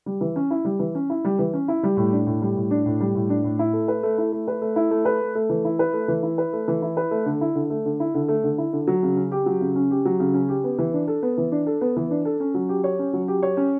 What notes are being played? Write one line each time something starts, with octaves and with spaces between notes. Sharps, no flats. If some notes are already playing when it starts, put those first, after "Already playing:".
G3
E3
C#4
E4
G3
E3
C#4
E4
G3
E3
C#4
E4
G3
A2
D4
A2
G3
A2
D4
A2
G3
A2
D4
A2
E4
A3
B4
A3
E4
A3
B4
A3
E4
A3
B4
A3
A3
E3
E4
B4
A3
E3
E4
B4
A3
E3
E4
B4
A3
D3
E4
D3
A3
D3
E4
D3
A3
D3
E4
D3
F#3
C#3
C#4
G4
F#3
C#3
C#4
G4
F#3
C#3
C#4
G4
B3
E3
D4
A4
B3
E3
D4
A4
B3
E3
D4
A4
C#4
F#3
G4
C#5
C#4
F#3
G4
C#5
C#4